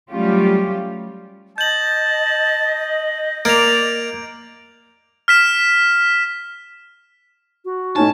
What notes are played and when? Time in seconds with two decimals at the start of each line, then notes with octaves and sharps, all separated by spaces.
0.11 F#3 G3 A3 C#4 F4 G4
1.58 D#5 A5 G6 F#7
3.45 A#3 D5 D7 F7
5.28 F6 B6 E7
7.65 F#4
7.96 A2 C#4 D#4 G#5 A5